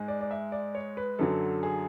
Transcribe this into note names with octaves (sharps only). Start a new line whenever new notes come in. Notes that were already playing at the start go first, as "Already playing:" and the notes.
Already playing: G#2 G#3
D5
D5
E5
D5
C#5
B4
F#2 D3 F#3 A4
G#4